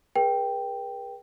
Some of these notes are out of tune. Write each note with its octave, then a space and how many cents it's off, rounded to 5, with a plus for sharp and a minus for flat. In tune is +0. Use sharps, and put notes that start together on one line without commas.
G#4 +0 B4 -45 G5 +0